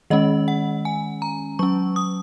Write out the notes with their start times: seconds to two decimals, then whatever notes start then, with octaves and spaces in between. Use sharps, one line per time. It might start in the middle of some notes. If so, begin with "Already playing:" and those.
0.10 D#3 G#3 C#4 D#5
0.48 F#5
0.85 G#5
1.22 A#5
1.59 F#3 C#4 C#6
1.96 D#6